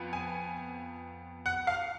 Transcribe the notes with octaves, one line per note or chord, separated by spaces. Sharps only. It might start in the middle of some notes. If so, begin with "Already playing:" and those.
Already playing: F2 F3 B3
G#5
F#5
F5